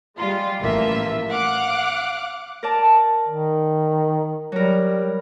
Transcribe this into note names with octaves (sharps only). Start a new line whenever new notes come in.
G3 G#3 F4
A1 E3 F3 A#3 F4 E5
F5 F#5 D6 F#6
A#4 D5 A5
D#3
F#3 G3 A#4